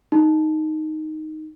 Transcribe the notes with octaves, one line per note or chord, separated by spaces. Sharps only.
D#4